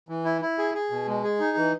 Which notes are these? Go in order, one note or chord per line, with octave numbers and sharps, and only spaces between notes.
E3
E4
E4
G#4
G#4
B2
G#3
G#4
D#4
E3